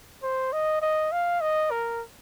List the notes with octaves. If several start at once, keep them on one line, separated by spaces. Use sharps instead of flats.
C5
D#5
D#5
F5
D#5
A#4